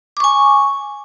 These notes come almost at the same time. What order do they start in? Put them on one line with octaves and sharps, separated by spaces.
D6 C#6 G#5